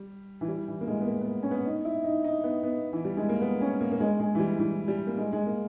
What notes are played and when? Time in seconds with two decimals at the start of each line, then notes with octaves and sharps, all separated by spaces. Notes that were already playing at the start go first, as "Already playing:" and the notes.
Already playing: G3
0.41 E3
0.48 G3
0.68 E3
0.81 A#3
0.87 G#3
1.00 B3
1.07 A#3
1.21 B3
1.43 C#4
1.51 B3
1.65 D#4
1.85 E4
2.04 D#4
2.24 D#4
2.44 B3
2.63 B3
2.93 E3
3.05 G3
3.17 G#3
3.29 A#3
3.41 B3
3.61 C#4
3.81 A#3
3.92 A#3
4.00 G#3
4.20 G#3
4.35 E3
4.39 G3
4.59 E3
4.88 G3
5.07 A#3
5.18 G#3
5.32 G#3
5.47 A#3